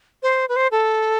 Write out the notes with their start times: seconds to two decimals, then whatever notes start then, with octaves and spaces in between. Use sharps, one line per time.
0.23 C5
0.49 B4
0.56 C5
0.71 A4